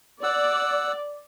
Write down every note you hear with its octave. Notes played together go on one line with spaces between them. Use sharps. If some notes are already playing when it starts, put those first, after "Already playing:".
D5 F#5 E6